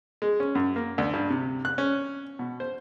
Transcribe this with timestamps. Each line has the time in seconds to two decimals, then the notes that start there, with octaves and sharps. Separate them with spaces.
0.22 G#3
0.40 C#4
0.55 F#2
0.76 A#3
0.98 D2
1.14 G2
1.30 C3
1.65 F#6
1.78 C#4
2.39 B2
2.60 C5